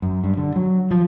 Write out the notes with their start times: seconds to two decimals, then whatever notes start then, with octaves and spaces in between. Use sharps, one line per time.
0.02 F#2
0.24 G2
0.37 D3
0.56 F#3
0.91 F3